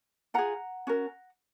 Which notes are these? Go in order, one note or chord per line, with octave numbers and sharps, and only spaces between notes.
F4 G#4 F#5 A#5
C#4 F#4 A#4